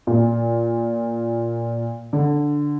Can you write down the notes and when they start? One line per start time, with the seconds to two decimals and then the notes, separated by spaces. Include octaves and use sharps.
0.07 A#2
2.13 D3